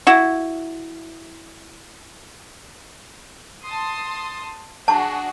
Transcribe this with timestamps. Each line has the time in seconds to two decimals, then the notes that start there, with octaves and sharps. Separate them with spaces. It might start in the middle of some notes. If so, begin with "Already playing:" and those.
0.07 E4 F#4
3.64 A5 C6 D#6
4.88 D4 F#4 G#4 A5 C#6